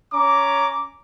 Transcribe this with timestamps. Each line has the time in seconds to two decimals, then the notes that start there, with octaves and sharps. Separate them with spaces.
0.13 C#4 A#5 D6